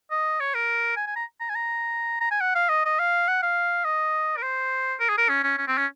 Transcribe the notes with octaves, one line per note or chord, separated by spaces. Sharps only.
D#5
C#5
A#4
G#5
G#5
A#5
A#5
G#5
A#5
A#5
G#5
F#5
F5
D#5
D#5
F5
F#5
F5
D#5
A#4
C5
A#4
G#4
A#4
C#4
C#4
C#4
C4
C#4